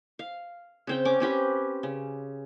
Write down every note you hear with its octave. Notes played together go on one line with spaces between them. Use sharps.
F5
C#3 C4 G5
C#4 D6
C4 C#4 G4 B4
C#3